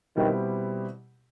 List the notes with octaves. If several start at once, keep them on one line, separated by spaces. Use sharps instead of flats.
B2 D#3 G3 C4 E4 G4